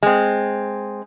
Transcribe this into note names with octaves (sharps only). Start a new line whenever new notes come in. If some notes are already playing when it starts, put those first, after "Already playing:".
G#3 C4